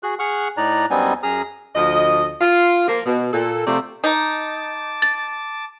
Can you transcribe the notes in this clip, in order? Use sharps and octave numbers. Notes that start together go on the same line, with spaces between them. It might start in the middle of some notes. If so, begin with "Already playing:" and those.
F#4 G#4 F#6
G#4 F#5 C#6 F6 F#6
A2 D#4 D5 A#5 F#6
F#2 G3 B3 C4 D#4 G#5
F#2 G#4 A#5 D#6 F6
D2 F3 D#5
F4
F3 A#3
B2
A#2 A4
C3 F3 A3 F4 D5
D#4 A5 D6
A6